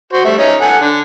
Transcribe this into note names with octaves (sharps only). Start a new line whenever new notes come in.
F#4 C5
G3 A3 E5
C#4 D#4
A4 F#5 G#5
D3